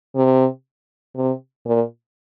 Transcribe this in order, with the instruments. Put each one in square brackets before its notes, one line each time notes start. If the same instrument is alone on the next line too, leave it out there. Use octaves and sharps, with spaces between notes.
[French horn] C3
C3
A#2